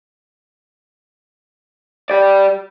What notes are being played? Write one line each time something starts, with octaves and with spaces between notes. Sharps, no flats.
G4 D5